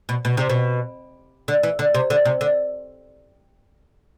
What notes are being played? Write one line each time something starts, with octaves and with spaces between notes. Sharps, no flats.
B2
B2
C3
B2
D3
E3
D3
C3
D3
C3
D3